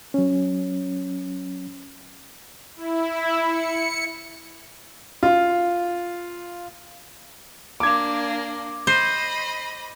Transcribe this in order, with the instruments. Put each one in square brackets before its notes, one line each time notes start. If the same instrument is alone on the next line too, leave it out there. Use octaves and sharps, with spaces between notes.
[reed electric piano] F#3 C#4
[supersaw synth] E4
C#7
[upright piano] F4
[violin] A#3 D4 [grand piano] D6 G#6
[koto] C5 [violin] D#5 B5